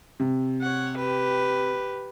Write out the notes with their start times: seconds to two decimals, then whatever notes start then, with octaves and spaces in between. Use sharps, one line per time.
0.20 C3
0.62 C#5 F#5
0.99 G4 B4